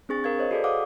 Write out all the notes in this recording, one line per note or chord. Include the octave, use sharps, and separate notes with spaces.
C4 D4 G#4 C#6 A6
A#4 F5 G#6
C5 C#5 D#5
F#4 G#4 A4 D5
A4 F5 F#5 D6 D#6